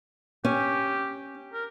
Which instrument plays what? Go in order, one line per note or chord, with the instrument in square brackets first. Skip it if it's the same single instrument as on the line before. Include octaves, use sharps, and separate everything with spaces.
[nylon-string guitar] C#4 [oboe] G4
[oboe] A#4